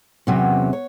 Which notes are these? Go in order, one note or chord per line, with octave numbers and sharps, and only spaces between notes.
E2 C3 F#3 C#4
C#5